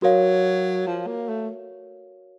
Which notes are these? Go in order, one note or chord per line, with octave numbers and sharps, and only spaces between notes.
F#3 F#4 A#4 C#5 F5
F3
A#3
A3